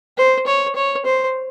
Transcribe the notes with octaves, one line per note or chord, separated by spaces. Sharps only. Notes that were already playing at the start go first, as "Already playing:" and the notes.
C5
C#5
C#5
C5